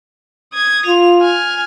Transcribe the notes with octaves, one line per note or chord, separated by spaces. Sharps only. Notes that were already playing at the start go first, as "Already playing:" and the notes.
D#6 G#6
F4 F7
G#5 F6